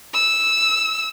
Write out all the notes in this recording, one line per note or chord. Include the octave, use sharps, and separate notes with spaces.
E6